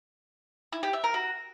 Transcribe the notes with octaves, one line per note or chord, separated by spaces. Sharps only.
E4
G4
E5
A#4
F#4